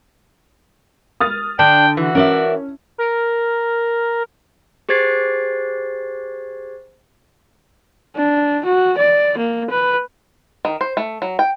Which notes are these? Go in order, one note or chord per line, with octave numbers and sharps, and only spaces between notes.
D#6 F6 A6
D3 D4 G5
E3 F#4
C#4 A#4 D5 E5
A#4
G4 G#4 C5 G#6 A6 C7
D4
F#4
D5
A#3
B4
D#3
C5
A3
F#3
G5